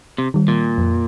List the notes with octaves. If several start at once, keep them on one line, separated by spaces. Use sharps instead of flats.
C3
D#3 G3
A#2
F2